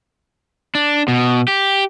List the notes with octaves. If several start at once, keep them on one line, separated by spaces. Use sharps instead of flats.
D4
B2
G4